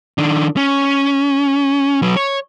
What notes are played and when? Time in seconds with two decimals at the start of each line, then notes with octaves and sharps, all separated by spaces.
0.18 D#3 D4
0.57 C#4
2.02 F#3 B4
2.17 C#5